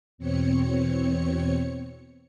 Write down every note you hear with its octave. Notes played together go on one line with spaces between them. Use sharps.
E2 B2 C4 C#5 C#7